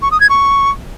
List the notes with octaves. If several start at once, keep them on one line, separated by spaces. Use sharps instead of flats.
C#6
D#6
G#6
C#6